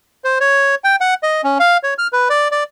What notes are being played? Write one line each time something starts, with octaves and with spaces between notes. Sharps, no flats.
C5
C#5
G5
F#5
D#5
C#4
F5
C#5
F6
B4
D5
D5